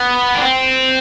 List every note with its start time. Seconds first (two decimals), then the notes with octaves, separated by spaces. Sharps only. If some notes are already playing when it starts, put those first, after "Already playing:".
Already playing: B3
0.35 D4
0.41 C4